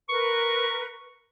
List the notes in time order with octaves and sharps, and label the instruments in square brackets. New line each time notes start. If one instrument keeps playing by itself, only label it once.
[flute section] A#4 B4 [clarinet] C#6